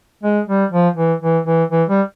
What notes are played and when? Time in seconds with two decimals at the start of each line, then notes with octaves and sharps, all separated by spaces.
0.23 G#3
0.47 G3
0.72 F3
0.96 E3
1.22 E3
1.47 E3
1.71 E3
1.89 G3